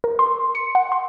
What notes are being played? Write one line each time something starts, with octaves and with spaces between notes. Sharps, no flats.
A#4
C6
C#7
F#5
C6